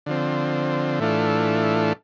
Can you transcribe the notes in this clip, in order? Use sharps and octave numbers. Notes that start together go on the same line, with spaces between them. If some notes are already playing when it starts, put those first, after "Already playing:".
D3 F3 C4
A2 E3 A3 D4 F4